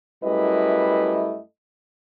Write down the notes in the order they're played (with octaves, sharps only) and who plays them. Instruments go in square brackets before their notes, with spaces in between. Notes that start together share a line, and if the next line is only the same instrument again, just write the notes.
[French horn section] F#2 G3 A3 E4 B4 D#5